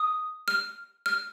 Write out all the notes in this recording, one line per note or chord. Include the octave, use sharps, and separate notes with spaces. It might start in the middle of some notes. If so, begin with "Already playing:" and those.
Already playing: D#6
F6
F6